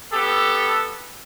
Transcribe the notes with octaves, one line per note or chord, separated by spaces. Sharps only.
B3 G4 A4